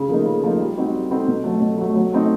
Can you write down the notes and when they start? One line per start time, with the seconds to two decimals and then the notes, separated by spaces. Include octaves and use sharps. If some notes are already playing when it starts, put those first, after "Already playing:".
Already playing: C#3
0.08 F3 A#3 D#4
0.25 C#3
0.43 F3 A#3 D#4
0.60 G3
0.77 C4 D#4 F#4
0.94 G3
1.10 C4 D#4 F#4
1.28 B2
1.44 F#3 A3
1.61 B2
1.78 F#3 A3
1.96 F#3
2.12 A3 C4 D#4